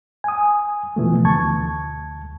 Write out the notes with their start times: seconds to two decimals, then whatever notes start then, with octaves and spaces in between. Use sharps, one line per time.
0.24 G#5 D#6
0.96 B2 E3 F3 A3
1.25 D2 A5 C#6 G#6